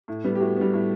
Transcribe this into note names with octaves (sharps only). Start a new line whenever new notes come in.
A2
G3 B3
G4
A2 F#4
B3
G3
A2